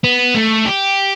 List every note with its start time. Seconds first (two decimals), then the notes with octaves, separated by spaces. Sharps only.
0.04 B3
0.35 A3
0.66 G4